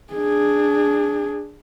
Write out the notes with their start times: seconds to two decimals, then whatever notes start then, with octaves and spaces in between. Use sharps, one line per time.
0.14 D4 G#4